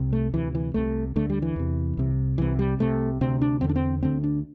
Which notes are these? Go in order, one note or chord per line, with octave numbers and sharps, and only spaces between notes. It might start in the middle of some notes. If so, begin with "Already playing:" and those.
Already playing: C2 C3
A3
D2 C3 E3
E3
C2 C3 A3
D2 D3 A3
G3
E3
E2 C3
C2 C3
C2 C3 E3
G3
C2 C3 A3
D2 C3 C4
D4
E2 D3 C4
D4
C4
D2 D3 C4
D4